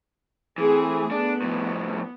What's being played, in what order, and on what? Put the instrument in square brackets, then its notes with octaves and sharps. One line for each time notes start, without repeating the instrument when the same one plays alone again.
[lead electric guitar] E3 [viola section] A3 C4 G#4
[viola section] B3 [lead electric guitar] D4
[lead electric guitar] F2 A2